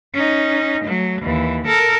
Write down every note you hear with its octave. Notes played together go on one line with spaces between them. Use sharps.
C#4 D#4
F#3 A3
D#2 E3
A4 A#4